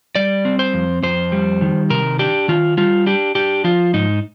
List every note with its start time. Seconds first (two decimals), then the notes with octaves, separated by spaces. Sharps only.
0.16 G3 D5
0.45 C4
0.59 C5
0.74 F2
1.03 F2 C5
1.32 G3
1.61 D#3
1.90 C3 A#4
2.19 D4 G4
2.48 D#3 F4
2.77 G3 F4
3.06 D4 G4
3.35 D4 G4
3.64 F3 F4
3.94 G#2 D#4